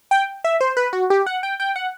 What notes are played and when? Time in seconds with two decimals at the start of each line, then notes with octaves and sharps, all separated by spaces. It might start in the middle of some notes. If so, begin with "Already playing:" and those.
0.11 G5
0.44 E5
0.61 C5
0.77 B4
0.93 F#4
1.10 G4
1.26 F#5
1.43 G5
1.60 G5
1.76 F#5